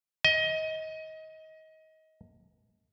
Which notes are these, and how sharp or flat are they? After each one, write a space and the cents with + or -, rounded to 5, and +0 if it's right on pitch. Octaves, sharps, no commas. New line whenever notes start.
D#5 +25